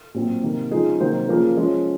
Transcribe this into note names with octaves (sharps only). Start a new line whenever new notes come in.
A#2 F#3 C4
C3 D#3 A#3
C#3 F3 G#3 D#4 G#4
C3 D#3 F#3 A#3 C5
C#3 F3 A#3 A#4
F3 G#3 C#4